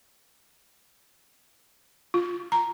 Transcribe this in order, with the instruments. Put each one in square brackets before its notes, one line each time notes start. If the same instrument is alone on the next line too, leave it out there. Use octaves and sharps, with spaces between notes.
[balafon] F4
A#5